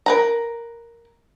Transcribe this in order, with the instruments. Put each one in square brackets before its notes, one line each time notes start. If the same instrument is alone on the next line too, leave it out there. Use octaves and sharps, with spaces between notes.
[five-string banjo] A#4 B4 A#5